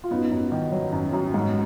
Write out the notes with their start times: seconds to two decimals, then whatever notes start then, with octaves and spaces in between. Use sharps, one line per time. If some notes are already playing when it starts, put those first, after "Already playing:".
0.04 F4
0.11 F#2 B3 D#4
0.31 F#2
0.52 D#3
0.72 F#3
0.92 F#2
1.13 F#2
1.34 G#2